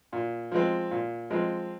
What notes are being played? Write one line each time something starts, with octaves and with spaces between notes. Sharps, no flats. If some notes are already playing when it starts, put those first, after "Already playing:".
A#2
F3 G#3 C4
A#2
F3 G#3 C4